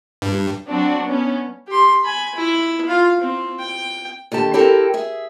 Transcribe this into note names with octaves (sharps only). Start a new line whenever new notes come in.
G2
F#3 C4 D4 F#4
B3 C#4
G4 C6
G#5 B5
E4
F4 F5
C4
G5
D#2 D3 G4 A5
C4 E4 G4 A4 A#4 G5
G#4 E5